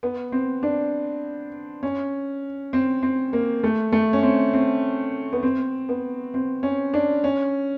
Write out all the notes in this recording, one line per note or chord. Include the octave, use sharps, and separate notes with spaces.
B3
C4
D4
C#4
C4
C4
A#3
A3
A3
C#4
C4
C4
B3
C4
B3
C4
C#4
D4
C#4